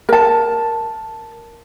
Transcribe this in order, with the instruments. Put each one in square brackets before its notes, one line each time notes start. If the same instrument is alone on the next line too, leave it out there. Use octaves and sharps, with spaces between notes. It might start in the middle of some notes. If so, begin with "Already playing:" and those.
[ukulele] A#4 A5